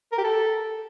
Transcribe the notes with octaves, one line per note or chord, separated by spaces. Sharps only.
A#4
G4
A4